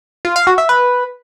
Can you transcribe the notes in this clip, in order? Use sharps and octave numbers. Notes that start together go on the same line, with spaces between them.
F4
F5
F#4
E5
B4